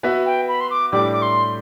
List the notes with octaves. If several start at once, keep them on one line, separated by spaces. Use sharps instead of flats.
B3 F#4 B4 E5
G5
B5
C6
D6
A2 G3 D4 G4 D6
D6
C6